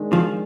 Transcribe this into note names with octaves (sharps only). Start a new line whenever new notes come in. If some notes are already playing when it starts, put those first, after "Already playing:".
Already playing: D#3 G#3 D4
D#3 F3